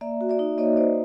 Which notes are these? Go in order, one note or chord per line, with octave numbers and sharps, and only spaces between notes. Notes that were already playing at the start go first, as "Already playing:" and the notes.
A#3 D5 E5
F#4
D5 E5
D#4
A#3 C#5 D#5
A#3 C5 D5